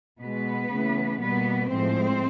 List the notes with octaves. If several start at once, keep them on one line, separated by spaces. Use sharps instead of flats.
B2 G#3 B3 B4
C#3 E3 A3
B2 G3 A#3 B3 B4
A2 F3 G#3 C4 C5